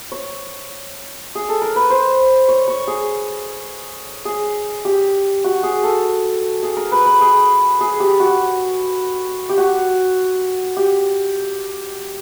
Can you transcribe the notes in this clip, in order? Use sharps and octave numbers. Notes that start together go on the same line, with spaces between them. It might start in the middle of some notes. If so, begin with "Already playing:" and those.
C#5
G#4
A4
A#4
B4
C5
C#5
C#5
G#4
G#4
G4
F#4
G#4
A4
G#4
A#4
B4
B4
G#4
G#4
G4
F#4
G4
F#4
G4